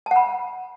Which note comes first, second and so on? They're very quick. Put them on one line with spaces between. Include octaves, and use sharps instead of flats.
A5 F#5 B5